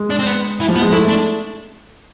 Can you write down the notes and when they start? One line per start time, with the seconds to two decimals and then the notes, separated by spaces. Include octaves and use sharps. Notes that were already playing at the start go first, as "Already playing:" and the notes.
Already playing: G#3
0.10 D4
0.19 C4
0.26 B3
0.60 E3
0.68 F3
0.75 B3
0.81 G#3
0.92 A3 E4
1.08 D4